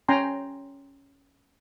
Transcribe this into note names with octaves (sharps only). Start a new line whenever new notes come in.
C#4 G5 G#5 A#5 C6